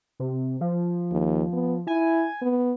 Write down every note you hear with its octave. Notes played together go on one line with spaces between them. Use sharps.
C3
F3
D#2
B3
E4 G#5
B3